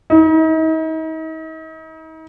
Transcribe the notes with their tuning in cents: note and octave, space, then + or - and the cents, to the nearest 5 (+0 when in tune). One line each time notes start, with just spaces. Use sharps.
D#4 +40